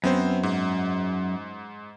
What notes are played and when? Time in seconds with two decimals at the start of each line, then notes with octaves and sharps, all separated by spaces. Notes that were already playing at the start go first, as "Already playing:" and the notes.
0.04 F#2 B3 C4 C5
0.43 G#2